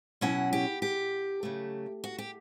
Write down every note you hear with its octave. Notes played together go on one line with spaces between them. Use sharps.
B2 F#3 C#4 E4 F#5
G4
G4
C#3 F#3 A3
F#4
G4